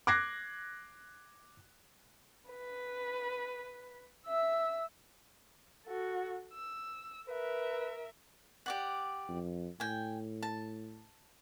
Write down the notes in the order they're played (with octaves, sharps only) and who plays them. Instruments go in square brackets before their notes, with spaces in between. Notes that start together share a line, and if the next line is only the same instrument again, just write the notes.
[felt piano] D6 F#6 G#6 A#6 C7
[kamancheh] B4
E5 E6
F#4 A4
E6
[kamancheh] A#4 E5 [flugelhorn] B4
[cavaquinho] G4 D5 F#5
[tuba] F2
[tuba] A2 [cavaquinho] G5 G#5
[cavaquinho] A5